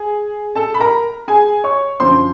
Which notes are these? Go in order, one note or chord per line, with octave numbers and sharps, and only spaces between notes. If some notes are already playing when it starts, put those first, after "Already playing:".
Already playing: G#4
A4 A5
B5
A#4 A#5
G#4 G#5
C#5 C#6
F#2 D3 F3 C5 C6